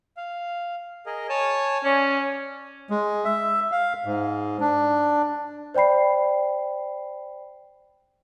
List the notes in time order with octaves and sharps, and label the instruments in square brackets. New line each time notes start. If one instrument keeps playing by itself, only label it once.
[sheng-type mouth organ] F5
G#4 A#4 D#5
C#5 G#5 A5
[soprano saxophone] C#4 [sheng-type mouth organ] D5
[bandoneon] G#3
E5
F5
G#2
D4
[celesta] C5 D5 G5 B5 C7